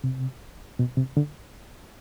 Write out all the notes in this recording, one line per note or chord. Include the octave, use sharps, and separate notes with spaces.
C3
B2
C3
D3